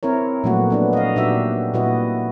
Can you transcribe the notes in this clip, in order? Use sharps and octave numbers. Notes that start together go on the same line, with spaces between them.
C4 E4 A#4 C#5
A#2 F3 F#3 A3 B3 F#4
B3 D4 B4
D#5 F5
A#2 D4 D#4 F#4 G4 E5
A#2 G3 E4 F#4 B4 D#5